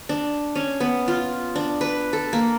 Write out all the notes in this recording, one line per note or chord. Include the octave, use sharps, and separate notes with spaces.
D4
C#4
B3
F4
D4
B4
A4
A#3